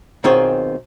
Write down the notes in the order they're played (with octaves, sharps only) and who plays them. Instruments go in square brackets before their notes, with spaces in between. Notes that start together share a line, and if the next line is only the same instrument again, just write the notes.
[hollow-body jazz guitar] B1 D#3 C4 F4 G#4 C#5